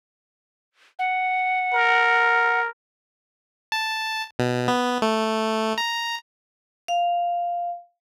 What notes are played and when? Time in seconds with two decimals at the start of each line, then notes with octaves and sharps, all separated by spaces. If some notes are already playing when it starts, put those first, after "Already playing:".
0.99 F#5
1.73 A#4
3.72 A5
4.39 B2
4.68 B3
5.02 A3
5.78 A#5
6.88 F5